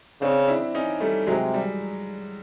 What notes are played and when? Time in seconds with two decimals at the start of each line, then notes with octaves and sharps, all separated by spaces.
0.21 C#3 C4 D4
0.47 D4 E4
0.75 C#4 D#4
1.00 G3 A3
1.27 C3 F#3 G#3
1.54 G3